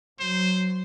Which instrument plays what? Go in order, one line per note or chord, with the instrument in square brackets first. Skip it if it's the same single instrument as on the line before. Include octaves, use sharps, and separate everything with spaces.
[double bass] F#3 [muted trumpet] C5